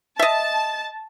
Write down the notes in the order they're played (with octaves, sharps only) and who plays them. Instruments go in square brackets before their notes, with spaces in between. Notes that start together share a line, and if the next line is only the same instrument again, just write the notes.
[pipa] D#5 E5 [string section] A5